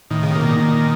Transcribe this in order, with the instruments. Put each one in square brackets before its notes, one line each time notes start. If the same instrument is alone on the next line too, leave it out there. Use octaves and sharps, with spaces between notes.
[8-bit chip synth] A2 [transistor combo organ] D#3
[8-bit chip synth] C#3
C3
[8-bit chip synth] B2 [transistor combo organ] A#3
[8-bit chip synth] A#2
[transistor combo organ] D#3